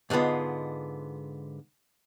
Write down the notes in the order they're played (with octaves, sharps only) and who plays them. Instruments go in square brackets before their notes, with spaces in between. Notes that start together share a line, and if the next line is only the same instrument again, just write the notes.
[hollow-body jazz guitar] G#2 D3 G#3 B3 F4